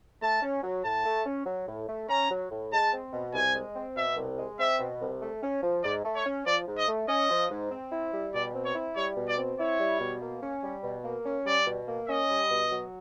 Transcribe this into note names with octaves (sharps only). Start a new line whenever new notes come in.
A3 A5
C#4
F#3
A2 A5
A3
C#4
F#3
A2
A3
C#4 A#5
F#3
A2
G#3 A5
C4
B2
C2 G#5
G#3
C4
B2 E5
C2
G#3
C4 E5
B2
C2
A3
C#4
F3
G#2 D5
A3
C#5
C#4
F3 D5
G#2
D#5
A3
C#4 D#5
F3
G#2
C4
E4
G3
B2 D5
C4
C#5
E4
G3 C#5
B2
D5
C4
E4 C#5
G3
B2
A#3
C#4
G3
B2
A#3
C#4
G3 D5
B2
A#3
C#4 D#5
G3
B2
F#3